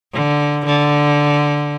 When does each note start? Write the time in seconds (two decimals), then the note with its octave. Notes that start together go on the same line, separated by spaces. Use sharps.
0.13 D3
0.65 D3